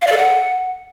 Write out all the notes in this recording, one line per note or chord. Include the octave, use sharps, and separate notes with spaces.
F5
D5
A4
F#5